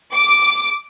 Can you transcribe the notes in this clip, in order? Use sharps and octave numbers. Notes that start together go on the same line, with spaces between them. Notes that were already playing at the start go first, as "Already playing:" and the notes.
D6